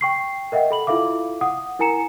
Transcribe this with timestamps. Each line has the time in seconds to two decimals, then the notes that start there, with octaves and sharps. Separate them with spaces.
0.01 G5 C#6 C7
0.52 A#4 D#5 E5 F#5 G5
0.70 A4 B5 F#7
0.87 E4 F4 A4 E5 F5 D6
1.41 F#5 D#6
1.79 E4 A#4 G#5 A#5 C#7 E7